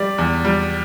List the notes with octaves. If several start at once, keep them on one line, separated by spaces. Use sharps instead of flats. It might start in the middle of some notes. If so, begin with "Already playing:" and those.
Already playing: G3 D5
E2
G3